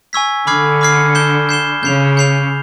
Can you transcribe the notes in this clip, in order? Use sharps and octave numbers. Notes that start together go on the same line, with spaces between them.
G#5 C#6 E6 G#6 B6
D3 B5 D6 F6 G#6 C7
B5 D6 F6 G#6 C7
G6 C7 E7 G7
G6 C7 E7 G7
C#3 G6 C7 F7
G6 C7 F7